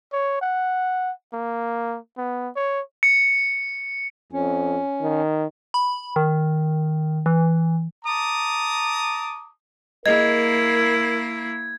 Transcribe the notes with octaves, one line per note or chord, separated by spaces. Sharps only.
C#5
F#5
A#3
B3
C#5
C#7
F2 C#4
D#3
B5
D#3
E3
A5 A#5 D6 D#6
A#3 E4 G#4 A#4 D#5 G#6